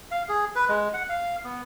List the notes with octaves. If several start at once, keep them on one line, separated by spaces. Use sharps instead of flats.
F5
G#4
B4
G#3
F#5
F5
B3